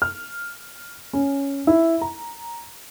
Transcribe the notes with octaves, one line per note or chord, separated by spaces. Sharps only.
F6
C#4
E4
A#5